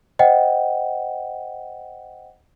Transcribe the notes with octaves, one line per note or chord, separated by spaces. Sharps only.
C5 D#5 F#5 G5